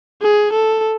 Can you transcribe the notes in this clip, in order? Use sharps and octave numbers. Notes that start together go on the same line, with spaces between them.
G#4
A4